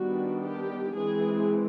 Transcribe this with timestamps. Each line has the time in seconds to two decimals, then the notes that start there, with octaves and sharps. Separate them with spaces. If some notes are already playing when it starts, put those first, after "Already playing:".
Already playing: D#3 G3 B3 D4 F#4
0.43 G4
0.96 E3 G#3 C4 G#4